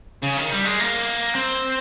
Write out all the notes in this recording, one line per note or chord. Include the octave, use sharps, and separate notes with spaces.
C#3
D#3
G3
G#3
A#3
C4